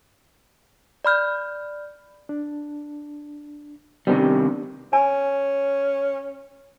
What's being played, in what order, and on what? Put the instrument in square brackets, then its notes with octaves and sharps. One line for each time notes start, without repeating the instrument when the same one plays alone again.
[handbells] D5 B5 F6 G6
[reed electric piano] D4
[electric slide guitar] C3 D#3 G3 [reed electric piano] B3 C4 D4
[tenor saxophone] C#4 [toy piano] G#5